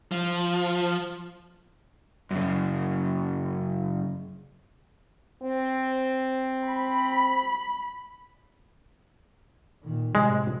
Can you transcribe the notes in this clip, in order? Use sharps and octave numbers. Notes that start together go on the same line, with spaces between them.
F3
F#2 C#3
C4
B5
A#2 D#3
A2 C3 G#3